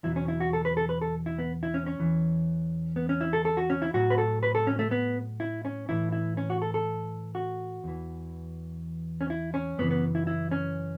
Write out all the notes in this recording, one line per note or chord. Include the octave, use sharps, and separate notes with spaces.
E2 B2 F#3 E4
C#4
E4
F#4
A4
B4
A4
B4
A4
E4
B3
E4
C#4
C#4
E2 E3
B3
C#4
E4
A4
A4
F#4
C#4
E4
A2 F#3 F#4
B4
A4
B4
A4
C#4
A3
B3
E4
C#4
A2 E3 E4
E4
C#4
F#4
A4
A4
F#4
E2 E3
C#4
E4
C#4
F#2 C#3 E3 B3
B3
E4
E4
C#4